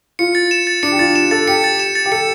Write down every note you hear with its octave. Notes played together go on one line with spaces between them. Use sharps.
F4 C#7
A6
E7
A6
D4 C#7
G4
F4 A6
E7
A4 A6
G4 C#7
A6
E7
A6
G4
A4 C#7